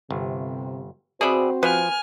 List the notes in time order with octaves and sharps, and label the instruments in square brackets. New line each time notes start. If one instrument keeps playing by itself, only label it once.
[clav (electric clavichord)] G1 [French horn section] C3
[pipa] B2 B5 [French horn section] C4 F#4 C5 [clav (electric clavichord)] G#4 D5 E5
[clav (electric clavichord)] F3 [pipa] B4 [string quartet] G#5 F6